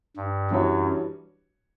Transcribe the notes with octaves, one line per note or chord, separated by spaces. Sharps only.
G2
F#2 E3 G3 D4 F#4 C#5